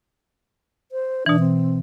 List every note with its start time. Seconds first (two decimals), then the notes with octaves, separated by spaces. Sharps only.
0.92 C5
1.26 B2 E3 D4
1.39 C4